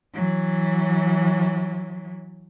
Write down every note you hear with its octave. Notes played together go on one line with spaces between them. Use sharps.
E3 F#3